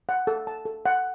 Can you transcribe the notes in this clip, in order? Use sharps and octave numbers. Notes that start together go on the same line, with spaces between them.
F#5
A4
A5
A4
F#5